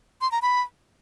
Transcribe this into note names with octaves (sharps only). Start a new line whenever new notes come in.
C6
A#5
B5